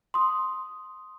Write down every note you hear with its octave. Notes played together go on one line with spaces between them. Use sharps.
C6 D#6